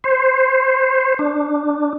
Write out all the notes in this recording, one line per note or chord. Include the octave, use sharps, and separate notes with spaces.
C5
D4